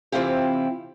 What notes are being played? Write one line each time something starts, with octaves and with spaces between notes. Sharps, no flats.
C3 E3 C4 E4 F4 G4